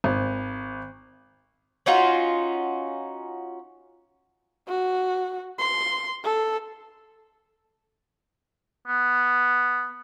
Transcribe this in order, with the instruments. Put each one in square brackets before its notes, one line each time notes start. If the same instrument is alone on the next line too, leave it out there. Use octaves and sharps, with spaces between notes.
[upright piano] G#1
[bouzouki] C#4 D#4 F4 F#4
[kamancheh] F#4
C6
A4
[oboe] B3